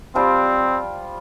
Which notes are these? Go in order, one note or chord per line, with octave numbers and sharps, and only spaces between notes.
F3 G3 C4 F4